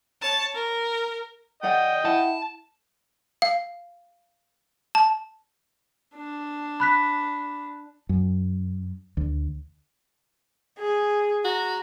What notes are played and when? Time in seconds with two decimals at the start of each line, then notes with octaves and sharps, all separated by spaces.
0.21 C#5 A5
0.54 A#4
1.63 G#4 D5 D#5 F#5 G5
2.05 E4 F#5 A5
3.42 F5
4.95 A5
6.15 D4
6.80 B5 F#6 B6
8.09 F#2
9.17 D2
10.79 G#4
11.45 F#4 A#5